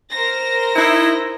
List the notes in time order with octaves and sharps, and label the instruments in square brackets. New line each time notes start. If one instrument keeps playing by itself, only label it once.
[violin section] A#4 C5 A#6
[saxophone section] D#4 E4